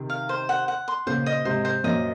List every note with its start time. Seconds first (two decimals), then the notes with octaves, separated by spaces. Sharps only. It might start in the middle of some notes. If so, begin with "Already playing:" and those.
Already playing: C3 D#3
0.10 F5
0.29 C5
0.49 F#5
0.68 F#5
0.88 C6
1.07 A#2 C#3 C5
1.26 D#5
1.45 G#2 C3 C5
1.65 C5
1.84 F#2 A#2 D#5